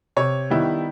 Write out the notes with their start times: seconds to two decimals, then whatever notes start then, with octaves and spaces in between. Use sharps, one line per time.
0.16 C3 C#5
0.50 D#3 G3 B3 E4